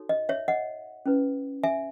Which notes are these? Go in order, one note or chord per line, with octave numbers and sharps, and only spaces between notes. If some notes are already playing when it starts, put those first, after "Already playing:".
Already playing: D#4 F#4 A4 C#5
D#5
C#5 E5
D#5 F#5
C#4 E4 B4
E5 G#5